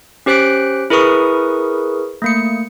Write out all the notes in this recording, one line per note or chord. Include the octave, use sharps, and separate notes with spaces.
C#4 G4 C5 F#6 B6 D7
E4 G#4 A#4 B4 C#6 D#6
A3 A#3 C#7